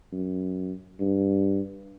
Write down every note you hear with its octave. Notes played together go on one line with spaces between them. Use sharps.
F#2
G2